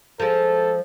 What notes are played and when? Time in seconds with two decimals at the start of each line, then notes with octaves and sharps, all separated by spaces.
0.20 F3 G#3 A4